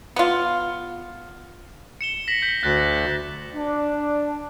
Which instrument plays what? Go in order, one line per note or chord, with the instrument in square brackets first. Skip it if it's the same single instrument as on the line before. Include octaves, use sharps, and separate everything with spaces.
[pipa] B3 F4
[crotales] C#7 E7 G7
A#6 B6 F#7
G6 B6 C#7
[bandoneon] D2 [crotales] F#6 A6
[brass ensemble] D4